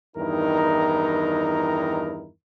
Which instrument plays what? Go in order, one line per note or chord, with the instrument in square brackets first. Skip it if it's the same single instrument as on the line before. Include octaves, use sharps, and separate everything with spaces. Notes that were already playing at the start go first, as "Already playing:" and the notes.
[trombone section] E2 G2 D#3 D#4 E4 A#4